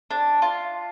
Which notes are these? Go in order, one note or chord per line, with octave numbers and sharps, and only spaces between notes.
D4
F4